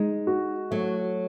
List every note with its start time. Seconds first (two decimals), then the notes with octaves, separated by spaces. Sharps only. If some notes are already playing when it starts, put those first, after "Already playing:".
Already playing: G#3 D#4
0.27 F#4
0.71 F#3 A3